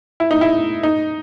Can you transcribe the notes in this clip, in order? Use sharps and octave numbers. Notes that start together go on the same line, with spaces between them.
E4
D#4
E4
D#4